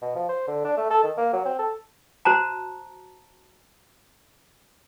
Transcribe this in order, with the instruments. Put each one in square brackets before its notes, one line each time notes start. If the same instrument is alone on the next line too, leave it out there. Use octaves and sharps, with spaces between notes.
[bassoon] B2
F3
C5
D3
D4
A3
A4
D#3
A#3
F#3
C4
A4
[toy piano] F#4 C5 A5 A#5